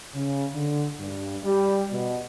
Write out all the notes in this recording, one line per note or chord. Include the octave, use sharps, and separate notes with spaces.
C#3
D3
G2
G3
B2